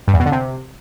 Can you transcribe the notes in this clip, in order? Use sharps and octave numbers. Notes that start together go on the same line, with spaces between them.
G2
E2
B2
D3
C3